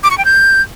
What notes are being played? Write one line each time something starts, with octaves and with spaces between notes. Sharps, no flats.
D6
C#6
G5
G6